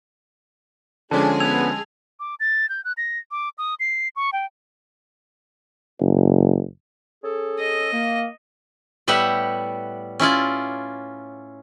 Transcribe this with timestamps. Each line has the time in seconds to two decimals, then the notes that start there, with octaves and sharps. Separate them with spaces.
1.11 D3 F3 G#3 C#4 D4 G#4 A5
1.40 B3 E6 G#6 F7
2.20 D6
2.40 A6
2.69 G6
2.85 F#6
2.97 A#6
3.31 D6
3.58 D#6
3.80 C7
4.16 C#6
4.33 G5
6.00 F#1
7.24 C#4 G#4 A4
7.59 D#5
7.92 A#3
9.07 A2 G3 B3 G4 E5 F#5
10.19 C#4 E4 F4 D5